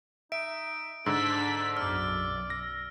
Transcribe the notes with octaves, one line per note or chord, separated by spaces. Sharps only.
D#4 E5 D7
G#2 D3 D4 A4 E6 B6
B1 F#2 D5 F6
A#6